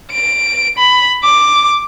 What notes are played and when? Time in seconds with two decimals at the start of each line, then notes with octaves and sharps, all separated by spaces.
0.12 D7
0.78 B5
1.24 D6